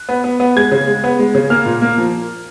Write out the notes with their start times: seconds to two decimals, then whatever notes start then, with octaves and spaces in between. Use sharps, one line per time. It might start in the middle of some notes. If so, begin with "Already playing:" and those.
Already playing: F#6
0.09 B3
0.24 B3
0.40 B3
0.56 G#3 G#6
0.72 C#3
0.87 G#3
1.04 B3
1.19 G#3
1.35 C#3
1.50 A#3 F6
1.66 A#2
1.82 A#3
1.98 F3